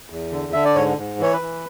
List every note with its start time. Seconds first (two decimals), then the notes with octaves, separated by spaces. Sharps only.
0.10 E2
0.32 D3
0.53 D3 E5
0.65 D5
0.75 G#2 C#5
0.98 G#2
1.20 E3 C#5
1.33 B4
1.41 E3